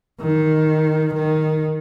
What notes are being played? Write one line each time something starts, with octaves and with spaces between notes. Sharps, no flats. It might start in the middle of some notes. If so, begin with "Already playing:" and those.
D#3
D#3